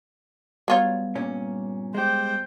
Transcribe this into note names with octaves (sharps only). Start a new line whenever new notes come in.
F#3 G3 B3 F4 C#5
G2 A#2 C#4
G#3 G4 C5 G5